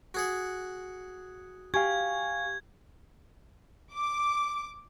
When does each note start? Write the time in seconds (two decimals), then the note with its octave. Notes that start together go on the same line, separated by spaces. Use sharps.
0.14 F#4 G#4 F#5
1.74 G4 F5 G#5 C#6 G#6
3.92 D6